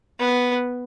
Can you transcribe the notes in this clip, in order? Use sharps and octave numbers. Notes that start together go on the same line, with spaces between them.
B3